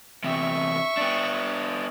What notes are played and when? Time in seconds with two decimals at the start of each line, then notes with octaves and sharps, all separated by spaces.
0.24 E2 C3 E5 C#6
0.97 B3 D4